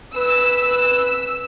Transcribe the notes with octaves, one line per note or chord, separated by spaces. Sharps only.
B4 E6